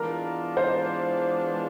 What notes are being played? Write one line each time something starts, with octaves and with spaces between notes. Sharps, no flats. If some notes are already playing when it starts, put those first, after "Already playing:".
Already playing: E3 G#3 B3 D4 F4 A#4
C5